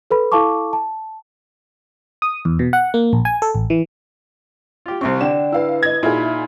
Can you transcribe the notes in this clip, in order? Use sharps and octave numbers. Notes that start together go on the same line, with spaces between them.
A4 B4 B5
E4 A4 F5 A5 C#6 D6
A5
D#6
E2
B2
F#5
A#3
A#1
G#5
A4
A1
E3
F4 G4
C2 C3 C4 C5 C#6
D3 D5 F#5 G5 E7
E4 B4 F5 E6
D#5 G#6
A#2 D#4 E4 F#4 G#4 B5